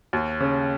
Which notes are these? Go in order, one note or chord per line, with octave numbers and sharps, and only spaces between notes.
D#2
C#3